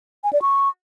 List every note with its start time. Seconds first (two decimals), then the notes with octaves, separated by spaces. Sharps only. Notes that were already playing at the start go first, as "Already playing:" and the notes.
0.24 G#5
0.33 D5
0.42 C#6